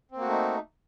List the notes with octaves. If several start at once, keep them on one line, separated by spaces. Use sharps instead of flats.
A3 A#3 C4 D#4 F#4